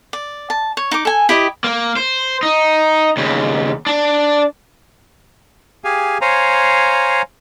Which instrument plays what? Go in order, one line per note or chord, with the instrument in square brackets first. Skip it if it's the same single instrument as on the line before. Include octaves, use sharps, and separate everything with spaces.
[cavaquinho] D5
A5
C#5
D#4 D6
A4 G#5
E4 G4 D#5
[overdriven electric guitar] A#3
C5
D#4
D#2 C#3
D4
[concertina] G4 G#4 F5 G#5
C5 C#5 F5 G#5 A#5